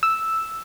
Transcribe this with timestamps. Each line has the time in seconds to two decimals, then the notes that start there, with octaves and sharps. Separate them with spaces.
0.03 E6